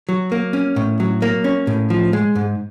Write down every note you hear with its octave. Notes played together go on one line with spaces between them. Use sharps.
F#3
A#3
C#4
A2
F#3
A#3
C#4
A2
F3
G#3
G#2